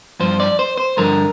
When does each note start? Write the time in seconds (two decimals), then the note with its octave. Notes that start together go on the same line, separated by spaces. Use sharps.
0.20 G2 F3 C5
0.40 D5
0.59 C5
0.78 C5
0.97 G2 D3 F3 A#4